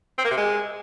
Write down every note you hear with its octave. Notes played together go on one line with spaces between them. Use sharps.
C4
A#3
C3
G#3